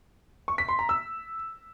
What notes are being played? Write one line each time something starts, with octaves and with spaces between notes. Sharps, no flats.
C#6
B6
C6
A#5
E6